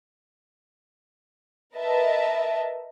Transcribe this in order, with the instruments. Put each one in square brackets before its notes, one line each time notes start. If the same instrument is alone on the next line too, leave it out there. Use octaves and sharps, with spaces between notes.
[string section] A#4 B4 D#5 E5 A5